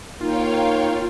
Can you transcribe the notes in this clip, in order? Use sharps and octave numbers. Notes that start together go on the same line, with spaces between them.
A#3 D#4 F4 C#5 F5 G5